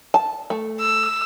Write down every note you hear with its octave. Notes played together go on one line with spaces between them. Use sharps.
A5
A3
E6